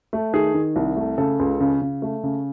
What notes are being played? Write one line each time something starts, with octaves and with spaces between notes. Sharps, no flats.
A3
D#3 G#4
D#3
C2
A3
C#3 A4
C#2
C#3
C#3
A3
C#3